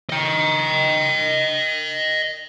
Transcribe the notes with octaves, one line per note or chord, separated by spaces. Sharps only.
D#5 G5